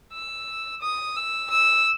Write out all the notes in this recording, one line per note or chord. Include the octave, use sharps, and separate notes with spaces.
E6
D#6
E6
E6